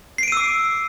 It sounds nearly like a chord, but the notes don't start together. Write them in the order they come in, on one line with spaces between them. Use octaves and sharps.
C7 D7 D#7 E6 D6